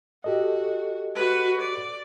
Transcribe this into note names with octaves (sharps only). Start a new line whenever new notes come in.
F#4 G4 A4 D#5
F#4 B4
D5